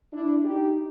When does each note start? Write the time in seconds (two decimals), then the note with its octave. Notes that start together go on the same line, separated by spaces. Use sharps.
0.13 D4 E4
0.44 D#4 G4